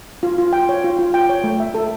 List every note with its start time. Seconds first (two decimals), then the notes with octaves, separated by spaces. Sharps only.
0.23 F4
0.38 F4
0.53 G5
0.69 C#5
0.84 F4
0.99 F4
1.14 G5
1.29 C#5
1.44 A3
1.60 E5
1.75 A4